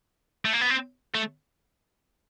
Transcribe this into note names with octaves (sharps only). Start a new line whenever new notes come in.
A3
A#3
B3
C4
A3